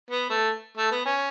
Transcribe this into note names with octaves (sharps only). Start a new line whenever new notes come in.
B3
A3
A3
B3
C#4